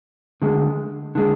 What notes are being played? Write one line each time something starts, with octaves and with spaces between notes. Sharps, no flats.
D2 D3 G#3
D3 G#3